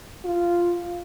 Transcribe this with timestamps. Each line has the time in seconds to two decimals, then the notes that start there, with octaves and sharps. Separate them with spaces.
0.25 F4